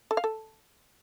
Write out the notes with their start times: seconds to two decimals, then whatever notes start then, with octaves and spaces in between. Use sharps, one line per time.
0.11 A4
0.17 F5
0.24 A4